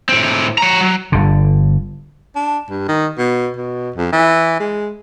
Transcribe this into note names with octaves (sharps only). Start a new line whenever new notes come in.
A2 C4
C#5 A#5
F#3
G1 D3
D4
G2
D#3
B2
B2
F2
E3
G#3